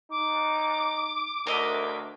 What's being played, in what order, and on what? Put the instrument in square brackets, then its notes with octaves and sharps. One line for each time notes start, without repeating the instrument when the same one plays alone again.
[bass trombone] D#4 [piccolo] D6
[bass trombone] D2 [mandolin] A#4 D#5 E5